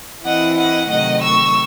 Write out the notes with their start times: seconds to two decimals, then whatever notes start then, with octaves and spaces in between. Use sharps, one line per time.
0.25 E3 C4 E4 D#5 F#5
0.57 D#5 F#5
0.89 C3 D#3 F#3 A3 D#5 F#5
1.21 C#6 E6